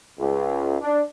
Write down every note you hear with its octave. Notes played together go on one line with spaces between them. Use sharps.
C#2
D4